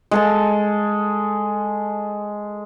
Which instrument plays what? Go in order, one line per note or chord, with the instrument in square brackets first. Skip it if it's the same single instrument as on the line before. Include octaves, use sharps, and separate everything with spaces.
[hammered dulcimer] G#3 A4 A5